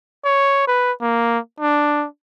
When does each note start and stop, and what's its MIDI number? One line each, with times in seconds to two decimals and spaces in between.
0.25 0.67 73
0.67 0.92 71
1.01 1.39 58
1.60 2.06 62